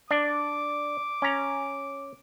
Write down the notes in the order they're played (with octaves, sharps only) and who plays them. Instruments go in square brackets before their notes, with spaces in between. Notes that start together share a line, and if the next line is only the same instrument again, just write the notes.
[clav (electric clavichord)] D4 [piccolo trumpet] D6
[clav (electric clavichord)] C#4 A#5